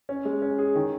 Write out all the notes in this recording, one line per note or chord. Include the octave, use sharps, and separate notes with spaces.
C#4
G#3
C#4
G#4
D#3